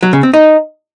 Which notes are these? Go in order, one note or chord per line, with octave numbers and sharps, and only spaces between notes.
F#3
C#3
C4
D#4